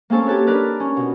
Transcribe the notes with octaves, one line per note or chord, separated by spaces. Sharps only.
A#3 C4 C#4 A4 C5
G4 A4 B4 C#5
D4 D#4 A#4 B4 D5
C#4
B2